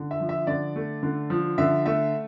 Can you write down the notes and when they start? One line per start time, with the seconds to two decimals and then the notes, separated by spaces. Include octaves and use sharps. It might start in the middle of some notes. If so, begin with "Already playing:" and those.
Already playing: D3
0.11 E5
0.20 F3
0.29 E5
0.47 D3 D5
0.76 A3
1.03 D3
1.30 F3
1.58 D3 E5
1.86 A3 E5